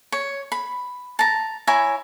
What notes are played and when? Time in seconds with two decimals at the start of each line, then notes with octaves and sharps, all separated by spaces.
0.12 C#5
0.52 B5
1.19 A5 A#5
1.67 E4 C#5 G#5 A#5